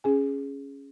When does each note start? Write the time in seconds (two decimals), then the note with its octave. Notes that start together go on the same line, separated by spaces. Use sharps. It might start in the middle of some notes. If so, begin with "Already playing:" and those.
0.04 C#4 G#4 G#5